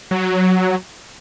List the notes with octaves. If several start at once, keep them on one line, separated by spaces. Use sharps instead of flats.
F#3